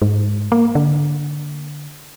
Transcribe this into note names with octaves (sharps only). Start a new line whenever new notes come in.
G#2
A#3
D3